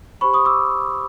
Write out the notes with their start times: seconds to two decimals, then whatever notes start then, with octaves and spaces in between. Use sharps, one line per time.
0.21 G4 C5 B5 C#6
0.33 C#6 D#6
0.45 D6 E6